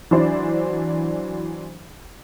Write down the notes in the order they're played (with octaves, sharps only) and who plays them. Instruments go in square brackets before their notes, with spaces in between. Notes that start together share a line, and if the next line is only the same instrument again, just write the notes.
[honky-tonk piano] E3 F#3 D4 E4 C5 D5